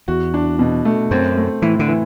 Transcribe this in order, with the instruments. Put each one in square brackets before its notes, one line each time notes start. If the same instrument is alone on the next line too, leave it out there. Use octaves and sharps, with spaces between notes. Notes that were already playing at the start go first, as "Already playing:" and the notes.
[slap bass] E2 [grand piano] F#4
[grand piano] D4
B2
A3
[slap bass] F#2 [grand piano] C4
[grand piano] A3
[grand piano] A2 [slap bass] E3
[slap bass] D3
[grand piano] E3